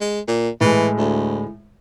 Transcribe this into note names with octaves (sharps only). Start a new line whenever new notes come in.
G#3
A#2
A2 E3 G#3
D2